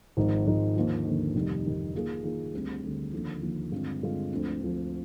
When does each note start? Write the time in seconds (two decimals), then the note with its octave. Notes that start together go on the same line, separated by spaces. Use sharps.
0.17 G#1 G#2 F3 G#3 D#4
0.46 G#1 G#2 F3 G#3 D#4
0.76 D#2 D3 F3
1.05 D#2 D3 F3
1.35 F1 F2 D#3 G3
1.65 F1 F2 D#3 G3
1.94 D#3 A#3 F4 G#4
2.24 D#3 A#3 F4 G#4
2.53 D2 D3 G3 C4
2.83 D2 D3 G3 C4
3.13 D#2 D3 F3
3.42 D#2 D3 F3
3.72 G2 D3 G#3 C4 F4
4.01 G2 D3 G#3 C4 F4
4.31 D2 D3 F3 C4
4.61 D2 D3 F3 C4